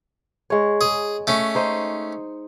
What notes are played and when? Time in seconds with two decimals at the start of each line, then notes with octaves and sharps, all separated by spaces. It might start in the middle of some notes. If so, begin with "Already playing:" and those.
0.50 G#3 C#5
0.81 G#4
1.27 A3 C#4
1.55 D#4 C5 D#5